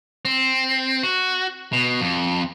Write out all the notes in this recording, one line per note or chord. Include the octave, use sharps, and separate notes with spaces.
C4
F#4
B2
F2